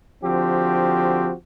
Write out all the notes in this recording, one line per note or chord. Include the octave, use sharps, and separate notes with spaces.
D3 F3 C4 F#4 G4